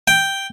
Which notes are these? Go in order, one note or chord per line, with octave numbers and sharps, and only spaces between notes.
G5